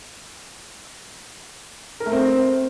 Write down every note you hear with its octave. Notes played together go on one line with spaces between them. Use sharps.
A#4
A3
C4